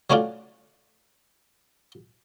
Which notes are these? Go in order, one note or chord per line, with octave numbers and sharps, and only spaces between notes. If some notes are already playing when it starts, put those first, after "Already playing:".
F#3 A3 C#4 D4 F4